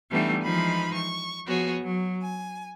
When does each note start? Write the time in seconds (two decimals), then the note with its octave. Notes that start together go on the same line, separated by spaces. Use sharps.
0.12 E3 G3 A3 B3 D4 D#4
0.43 E3 F3 G#3 D#4 F4 B5
0.93 C#6
1.47 F3 B3 F#4 G#4 C#5
1.83 F#3
2.22 G#5